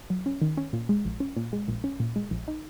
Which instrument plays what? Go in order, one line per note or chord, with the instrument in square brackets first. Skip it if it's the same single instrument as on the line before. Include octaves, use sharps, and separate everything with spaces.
[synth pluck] F#3
C#4
D#3
C#4
A#2
G#3
A#1
C#4
A#2
G#3
A#1
C#4
A#2
G#3
A#1
D#4